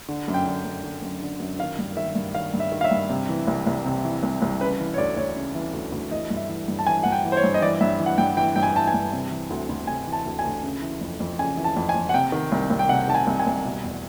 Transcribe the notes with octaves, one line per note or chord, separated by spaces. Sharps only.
D3
F#2
G5
D3
F#2
D3
F#2
D3
F#2
D#3 F5
G2
D#3 E5
G2
D#3 F5
G2
E5
D#3
F5
E5
G2
C3
E3
C2
C2
C3
E3
C2
C2
C#3 B4
E3
C#5
D2 D5
D2 C#5
C#3
E3
D2
D2
E3 D#5
G2
E5
E3
G2
A5
E3 G#5
G2 F#5
G5
E3
C5
C#5
G2
D#5
E3 D5
G2 E5
E3
F#5
G2 G5
E3 G5
G2 G5
G#5
E3 A5
G#5
G2
C3
E3
D2
D2
C3 G#5
E3
A5
D2
G#5
D2
C#3
E3
F2
F2
C#3 G#5
E3
A5
F2
G#5
F2
F#5
C3 G5
D#3
C2
C2
G5
C3 F#5
D#3 A5
G#5
C2
G#5
C2
B2
E2